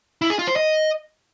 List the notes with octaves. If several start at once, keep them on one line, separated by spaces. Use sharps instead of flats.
E4
G#4
F4
C5
D#5